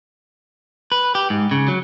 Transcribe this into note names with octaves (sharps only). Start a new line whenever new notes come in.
B4
G4
G#2
C#3
F#3